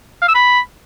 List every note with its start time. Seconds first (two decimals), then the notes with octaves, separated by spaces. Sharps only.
0.22 F5
0.28 E6
0.35 B5